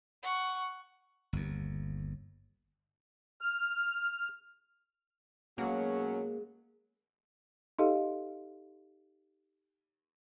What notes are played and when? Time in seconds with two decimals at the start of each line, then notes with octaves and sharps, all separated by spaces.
0.23 F#5 C#6
1.33 G1 D#2
3.41 F6
5.58 B2 F#3 G#3 A#3 C#4 G#4
7.79 D#4 G4 A4 D#5 F5